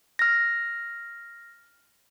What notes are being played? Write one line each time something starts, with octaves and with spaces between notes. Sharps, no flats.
F6 A#6